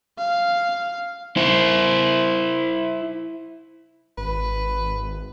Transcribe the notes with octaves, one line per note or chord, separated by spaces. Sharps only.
F5
E4 C5
G#1 B4